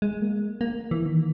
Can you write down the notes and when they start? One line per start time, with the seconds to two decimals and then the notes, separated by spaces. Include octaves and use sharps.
0.02 G#3
0.22 A#3
0.61 A#3
0.91 E3
1.05 D#3